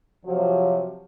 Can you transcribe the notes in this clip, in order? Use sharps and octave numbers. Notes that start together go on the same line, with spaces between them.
C3 F3 F#3